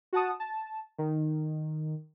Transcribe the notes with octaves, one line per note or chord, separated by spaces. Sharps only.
F#4 F#5 A5 D#6
A5
D#3